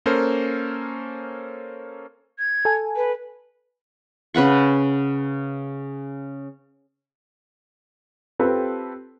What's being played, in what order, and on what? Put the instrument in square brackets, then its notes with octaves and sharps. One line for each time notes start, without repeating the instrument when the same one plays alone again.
[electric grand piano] A#3 C#4 A4 A#4 C5
[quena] G#6
[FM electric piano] A4 G#5
[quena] B4
[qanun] C#3 B4 F#5 C#6
[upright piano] C4 F4 G4 A4 B4